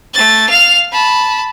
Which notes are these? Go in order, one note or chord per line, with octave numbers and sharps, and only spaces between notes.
A3 A6
F5 F7
A5 B5